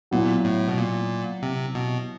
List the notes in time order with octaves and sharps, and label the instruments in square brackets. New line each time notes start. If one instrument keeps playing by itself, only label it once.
[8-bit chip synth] A#2 [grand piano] F#3 B3 E4
[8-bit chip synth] A2
B2
A#2
C3
B2